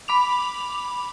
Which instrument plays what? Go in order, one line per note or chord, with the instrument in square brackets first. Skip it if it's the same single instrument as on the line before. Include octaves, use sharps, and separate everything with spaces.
[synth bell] B5 D6 F7